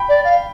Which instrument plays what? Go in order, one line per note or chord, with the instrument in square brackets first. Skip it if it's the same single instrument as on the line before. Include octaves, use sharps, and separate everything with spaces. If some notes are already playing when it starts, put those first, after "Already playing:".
Already playing: [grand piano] G5 B5
[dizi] D5
F5